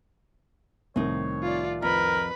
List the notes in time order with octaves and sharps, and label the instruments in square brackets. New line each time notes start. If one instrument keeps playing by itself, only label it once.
[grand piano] C2 A2 D#3 [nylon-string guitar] C4 D#4 [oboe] C#5
[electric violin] F4 D5
[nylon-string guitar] F2 [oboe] A#4 [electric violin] B4 B5